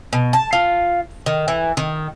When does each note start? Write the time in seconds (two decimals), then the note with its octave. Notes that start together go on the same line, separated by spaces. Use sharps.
0.13 B2
0.33 A5
0.53 F4
1.26 D#3
1.48 E3
1.77 D#3